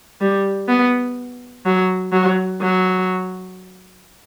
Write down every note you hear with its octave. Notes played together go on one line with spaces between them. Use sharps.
G3
B3
F#3
F#3
F#3